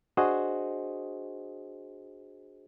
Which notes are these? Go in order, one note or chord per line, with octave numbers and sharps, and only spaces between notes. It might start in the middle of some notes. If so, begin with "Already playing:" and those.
D4 F#4 G#4 C5 D#5